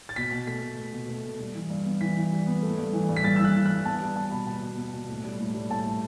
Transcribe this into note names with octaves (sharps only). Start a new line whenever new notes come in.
A6
B2 B6
B2
A3 B6
A3
A3
B2
A3
B2
G3
E3
G2
B3
E3 B6
E3
G3
B3
A3
G2
E3
G2
B6
G2 A6
E3 E6
F#6
E3
G2 F#6
B3 A5
G3
B3 A5
B2 B5
B3 A5
B2
B3
B2
A2
G3
A2
G3
A2 A5
A2